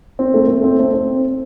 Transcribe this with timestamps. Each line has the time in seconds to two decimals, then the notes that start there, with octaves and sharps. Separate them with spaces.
0.19 C4
0.34 A3
0.48 A3
0.64 C4
0.79 C4
0.94 C4